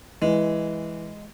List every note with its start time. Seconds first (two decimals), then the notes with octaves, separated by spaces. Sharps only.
0.22 E3 G#3